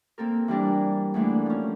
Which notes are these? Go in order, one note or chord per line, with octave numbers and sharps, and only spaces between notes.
A#3 C4 A4 A#4
E3 G3 D4 A#4
E2 E3 A3 A#3 D4
F3 C#4